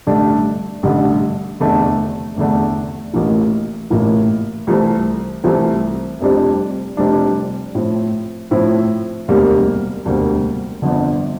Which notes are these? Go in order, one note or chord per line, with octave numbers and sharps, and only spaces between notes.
A1 G2 D3 A3 D4
A1 G2 D3 A3 D4
F1 E2 D3 A3 D4
F1 E2 D3 A3 D4
A1 A2 E3 A#3 E4
A1 A2 E3 A#3 E4
C2 C3 E3 A3 C4
C2 C3 E3 A3 C4
F1 F2 C3 G3 D4
F1 F2 C3 G3 D4
A2 F3 C4 E4
A2 F3 C4 E4
E1 D2 C3 G3 A#3
E1 D2 C3 G3 A#3
G1 F2 D3